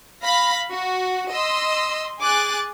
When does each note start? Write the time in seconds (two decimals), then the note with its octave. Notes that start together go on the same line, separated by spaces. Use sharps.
0.24 F5 B5 A#6
0.70 F#4
1.31 D#5 C6 E6
2.20 G#4 G#5 D6 F#6 A6